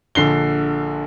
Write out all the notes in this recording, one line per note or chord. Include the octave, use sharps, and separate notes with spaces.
A#1 D3 C7 G7